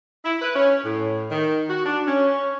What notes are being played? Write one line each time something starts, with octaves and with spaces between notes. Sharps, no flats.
E4
B4
C#4
A2
D#3
F#4
D4
C#4